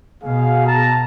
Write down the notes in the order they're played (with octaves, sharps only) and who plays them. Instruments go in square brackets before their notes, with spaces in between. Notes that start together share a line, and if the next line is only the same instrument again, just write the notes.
[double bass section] B2 [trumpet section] G#4 F5
[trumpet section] A5 A#5